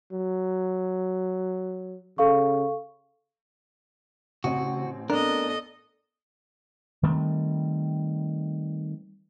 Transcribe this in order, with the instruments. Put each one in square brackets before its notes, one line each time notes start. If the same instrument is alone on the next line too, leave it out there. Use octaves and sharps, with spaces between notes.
[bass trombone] F#3
[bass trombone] C#3 [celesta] A4 F5 C#6
[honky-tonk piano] A1 C4 [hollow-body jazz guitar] C#3 D#5 [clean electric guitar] F#4
[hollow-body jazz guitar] B3 D4 [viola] A4 D#5 [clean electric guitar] A#4
[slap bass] D#3 G3 A3 C4